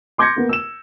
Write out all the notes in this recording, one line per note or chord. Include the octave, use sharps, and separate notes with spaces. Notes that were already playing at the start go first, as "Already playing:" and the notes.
C6 D6 G6 G#6 A#6 C#7
A#3 B3
E6 E7